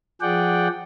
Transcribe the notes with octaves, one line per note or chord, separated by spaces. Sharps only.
F3 G#4 D5 F#5 G5